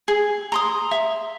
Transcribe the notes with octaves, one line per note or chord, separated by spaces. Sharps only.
G#4
A#5 C6 D#6
E5